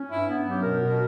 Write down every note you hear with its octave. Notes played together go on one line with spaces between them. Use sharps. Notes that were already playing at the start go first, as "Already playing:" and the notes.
Already playing: C#4
G2 E4
B3
F#3 G4
B2 A#4
B2